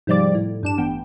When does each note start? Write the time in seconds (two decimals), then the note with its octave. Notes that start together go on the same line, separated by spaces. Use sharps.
0.07 G#2 C3 F3 G3 D5 D6
0.35 A2
0.63 G2 D4 E7
0.77 A1 B3 G5